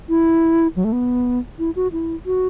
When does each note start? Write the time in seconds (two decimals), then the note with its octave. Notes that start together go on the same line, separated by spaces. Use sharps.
0.09 E4
0.76 F#3
0.84 A3
0.92 B3
1.59 E4
1.76 F#4
1.92 E4
2.26 F#4